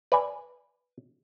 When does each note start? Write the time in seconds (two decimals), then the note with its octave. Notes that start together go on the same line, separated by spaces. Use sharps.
0.12 B4 D5 G#5